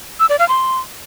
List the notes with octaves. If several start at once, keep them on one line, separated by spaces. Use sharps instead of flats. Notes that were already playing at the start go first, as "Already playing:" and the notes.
E6
D5
F5
C6